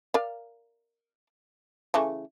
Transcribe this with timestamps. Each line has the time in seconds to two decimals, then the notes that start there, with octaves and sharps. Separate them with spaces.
0.14 A#4 D5 F5
1.94 C#3 E3 A3